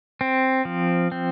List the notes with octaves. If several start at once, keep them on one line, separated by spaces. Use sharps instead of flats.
C4
F3
C4